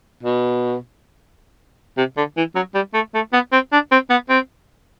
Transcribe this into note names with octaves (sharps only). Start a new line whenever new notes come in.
B2
C3
D3
E3
F#3
G3
A3
A3
B3
C4
D4
C4
B3
C4